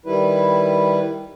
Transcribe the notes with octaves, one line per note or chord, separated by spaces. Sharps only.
D#3 G3 E4 B4